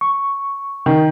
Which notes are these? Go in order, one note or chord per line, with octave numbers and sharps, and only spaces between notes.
C#6
D#3